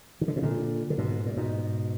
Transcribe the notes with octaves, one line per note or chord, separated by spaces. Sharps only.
D#3
D3
B2
A#2 D3
D3
G#2 B2
A#2
G#2 B2